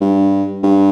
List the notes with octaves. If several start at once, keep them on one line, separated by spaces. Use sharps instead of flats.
G2
G2